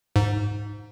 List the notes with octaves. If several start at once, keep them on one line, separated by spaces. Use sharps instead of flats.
G#2